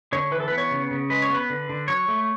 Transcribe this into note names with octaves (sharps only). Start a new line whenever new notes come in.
D3 C#5
E3 B4
A4
B4
B3
C#5
C#3
C#3
G#3 B4
C#5
B3 B4
D3
D3
F#3 C#5
A3